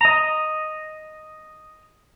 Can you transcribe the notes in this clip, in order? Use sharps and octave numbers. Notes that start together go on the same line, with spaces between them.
D#5 A#5